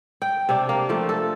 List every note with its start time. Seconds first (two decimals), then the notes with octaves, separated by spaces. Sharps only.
0.22 G5
0.49 C3 D4
0.69 A#3
0.89 F3 A3
1.09 A4